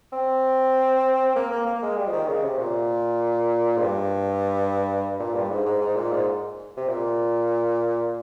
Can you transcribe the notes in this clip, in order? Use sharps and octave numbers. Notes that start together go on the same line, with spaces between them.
C4
A#3
A#3
A#3
G#3
G3
F3
D#3
C#3
C3
A#2
G#2
G2
A#2
G2
G#2
G#2
G#2
A#2
G#2
C3
A#2